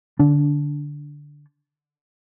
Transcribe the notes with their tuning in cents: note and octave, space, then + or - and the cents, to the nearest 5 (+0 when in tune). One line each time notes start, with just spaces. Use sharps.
D3 +0 D4 -20